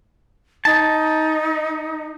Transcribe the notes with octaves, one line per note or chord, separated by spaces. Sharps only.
D#4 A5